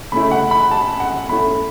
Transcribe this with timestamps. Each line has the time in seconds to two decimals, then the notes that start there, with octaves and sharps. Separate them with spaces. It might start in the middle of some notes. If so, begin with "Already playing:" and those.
0.12 C#3 A3 C#4 E4 B5
0.31 F#5
0.51 B5
0.71 A5
1.00 F#5
1.29 A2 A3 C#4 E4 B5